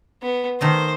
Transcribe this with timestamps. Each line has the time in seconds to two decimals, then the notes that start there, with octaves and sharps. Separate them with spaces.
0.22 B3
0.61 D#3 A3 C5 D#5